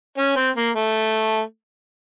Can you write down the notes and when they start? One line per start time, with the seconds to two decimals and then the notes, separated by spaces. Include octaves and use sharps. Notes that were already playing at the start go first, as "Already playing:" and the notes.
0.18 C#4
0.36 C4
0.56 A#3
0.75 A3